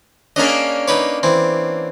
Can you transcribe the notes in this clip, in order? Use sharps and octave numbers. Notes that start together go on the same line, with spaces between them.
A#3 C#4 D4 G#4 D#5
D#4 B4 C#5
E3 C4